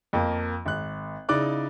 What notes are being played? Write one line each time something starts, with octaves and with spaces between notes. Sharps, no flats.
F2 A#3
G#1 F#6
C#3 D#4 E4 D5 D6 F#6